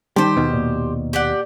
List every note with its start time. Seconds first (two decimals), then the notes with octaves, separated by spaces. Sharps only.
0.16 D#3 G3 G4 C5 A5 C6
0.37 D#2 B2
0.53 A#2
1.13 G4 D5 F#5